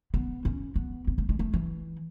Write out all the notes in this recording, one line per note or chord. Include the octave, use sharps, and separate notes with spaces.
B3
C#4
B3
B3
A3
G#3
A3
E3